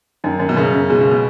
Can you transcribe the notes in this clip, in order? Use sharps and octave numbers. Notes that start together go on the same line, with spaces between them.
F#2 D#3
F#2
B2
F#2 C#3
F#2
B2 G#3
C#3
B2